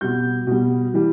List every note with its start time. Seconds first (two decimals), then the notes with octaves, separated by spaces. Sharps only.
0.01 B2 G3 G6
0.47 B2 G3
0.94 E3 G3